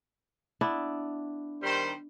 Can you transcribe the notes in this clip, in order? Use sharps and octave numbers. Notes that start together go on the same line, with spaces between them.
B3 D4 E4
D#3 G3 C5